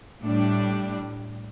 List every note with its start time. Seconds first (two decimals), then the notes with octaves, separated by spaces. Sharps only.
0.24 A2 G3 D4